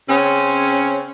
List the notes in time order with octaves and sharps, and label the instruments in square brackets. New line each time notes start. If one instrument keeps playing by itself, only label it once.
[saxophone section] C#3 C4 C#4